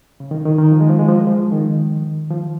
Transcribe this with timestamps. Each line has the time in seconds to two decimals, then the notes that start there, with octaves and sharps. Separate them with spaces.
0.20 C#3
0.31 D#3
0.45 D#3
0.58 D#3
0.72 F3
0.81 G#3
0.90 F3
0.99 G#3
1.09 F3
1.17 G#3
1.27 F3
1.52 D#3
2.30 F3